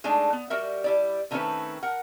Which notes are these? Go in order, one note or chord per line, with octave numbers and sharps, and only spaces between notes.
G#3 A3 D4 D#4
B3
G3 F#4 A#4 E5
G3 E4 D5
D3 D#3 A3 C4 C#4 B4
A#4 F#5